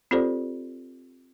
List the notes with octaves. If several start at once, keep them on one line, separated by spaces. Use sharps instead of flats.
C4 F4 G4 A4 C5 D5